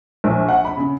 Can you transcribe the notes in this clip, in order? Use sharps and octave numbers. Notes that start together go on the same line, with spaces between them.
A#1
F#5
B5
C#3